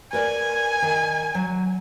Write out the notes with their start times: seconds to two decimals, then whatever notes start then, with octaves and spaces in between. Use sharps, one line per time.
0.13 A#4 B4 D5 G#5
0.82 D#3
1.35 F#3